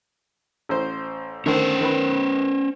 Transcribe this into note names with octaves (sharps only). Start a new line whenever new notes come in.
A1 C5
D3 D#3 A3 C#4 C5
D#3 B4